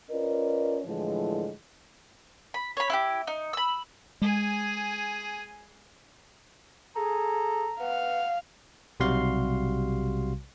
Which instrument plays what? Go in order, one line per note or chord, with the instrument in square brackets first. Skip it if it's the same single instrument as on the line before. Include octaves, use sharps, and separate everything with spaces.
[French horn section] C#4 F4 A#4 B4 D5 D#5
A2 D3 E3 F3 G#3
[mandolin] B5
C#5 B5
E4 F4 G4
D#4
B5 E6
[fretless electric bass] G#3 [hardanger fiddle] G#4 G#5
[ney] G#4 [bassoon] A4 [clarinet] A#5
[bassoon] B3 [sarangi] F5 [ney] F#5
[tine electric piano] B1 C3 G3 F#4 F5 C6